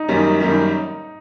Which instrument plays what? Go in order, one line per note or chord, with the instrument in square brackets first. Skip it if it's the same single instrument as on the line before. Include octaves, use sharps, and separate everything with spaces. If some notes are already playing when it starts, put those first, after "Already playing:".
Already playing: [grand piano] D#4
[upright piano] F#2 D#3 G3 A#3 C#4
F#2 D#3 G3 A#3 C#4